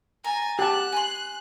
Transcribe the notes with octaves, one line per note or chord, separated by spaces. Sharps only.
G#5 A#5 A6
G4 F#5 A5 F#6
G#5 B5 C6